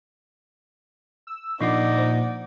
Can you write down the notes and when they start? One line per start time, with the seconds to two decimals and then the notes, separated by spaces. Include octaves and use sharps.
1.27 E6
1.61 A#2 F3 D4 D#4 D5 F#5 D6
1.98 C5